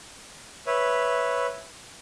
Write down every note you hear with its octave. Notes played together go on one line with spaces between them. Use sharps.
B4 C#5 E5